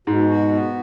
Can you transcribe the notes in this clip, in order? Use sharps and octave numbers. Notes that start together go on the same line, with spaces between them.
G#2 B2
F#4
B3